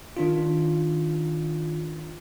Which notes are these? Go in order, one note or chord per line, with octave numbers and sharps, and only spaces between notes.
D#3 D4 F4